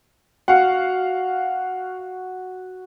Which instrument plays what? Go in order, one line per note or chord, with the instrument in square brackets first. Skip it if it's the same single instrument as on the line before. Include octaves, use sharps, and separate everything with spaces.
[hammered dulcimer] F#4 [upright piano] F5 F#5